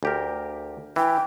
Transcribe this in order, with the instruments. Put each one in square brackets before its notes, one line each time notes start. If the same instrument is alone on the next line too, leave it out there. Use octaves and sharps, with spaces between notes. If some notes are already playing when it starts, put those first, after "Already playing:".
[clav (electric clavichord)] D2 G4 A#4
[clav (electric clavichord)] E3 [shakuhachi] G5